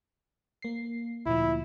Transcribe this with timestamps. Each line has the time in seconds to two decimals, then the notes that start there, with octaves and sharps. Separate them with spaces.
0.62 A#3 C7
1.26 D2 A#2 F3 E4